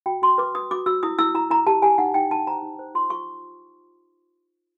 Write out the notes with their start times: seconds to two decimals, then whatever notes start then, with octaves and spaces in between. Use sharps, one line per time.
0.06 F#4 G5
0.22 F#4 C6
0.38 B4 D6
0.55 B4 D#6
0.71 F#4 D6
0.86 F#4 E6
1.03 E4 D#6
1.19 E4 E6
1.35 E4 A#5
1.50 E4 A#5
1.66 G4 A5
1.82 G4 G#5
1.98 D#4 F#5
2.14 D#4 G5
2.30 D#4 A5
2.47 C5 A#5
2.63 D#4
2.79 C5
2.95 F4 C6
3.10 F4 C#6